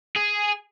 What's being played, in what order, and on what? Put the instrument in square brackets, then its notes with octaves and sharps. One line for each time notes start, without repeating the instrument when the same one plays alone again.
[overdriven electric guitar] G#4